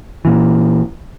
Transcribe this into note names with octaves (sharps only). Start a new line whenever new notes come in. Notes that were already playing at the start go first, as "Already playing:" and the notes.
A#2 E3